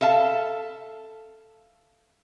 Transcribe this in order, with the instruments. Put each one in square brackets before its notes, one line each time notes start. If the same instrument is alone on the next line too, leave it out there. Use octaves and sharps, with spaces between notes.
[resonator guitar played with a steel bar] A4 E5 F5 A5